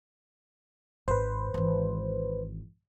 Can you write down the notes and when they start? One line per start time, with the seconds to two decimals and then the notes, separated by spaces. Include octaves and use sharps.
1.08 G#1 B4 C5
1.54 G#1 E3